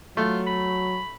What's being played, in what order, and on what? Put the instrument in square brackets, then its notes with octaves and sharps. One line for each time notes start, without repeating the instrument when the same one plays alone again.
[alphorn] F#3 [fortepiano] A3 [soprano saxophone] F4
[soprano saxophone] B5